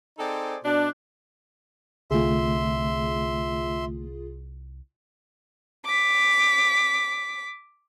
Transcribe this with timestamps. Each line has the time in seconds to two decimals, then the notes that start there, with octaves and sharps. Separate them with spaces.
0.18 C4 D#4 G#4 A4 C5 D5
0.64 B2 D4
2.11 C2 D3 A3 F4 G#4 E5 C6
5.85 D6 B6